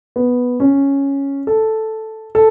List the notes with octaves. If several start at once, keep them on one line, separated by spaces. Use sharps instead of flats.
B3
C#4
A4
A4